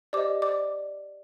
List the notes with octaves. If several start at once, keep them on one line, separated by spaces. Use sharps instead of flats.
G4 C5 D5 D#5 D6
D5 D6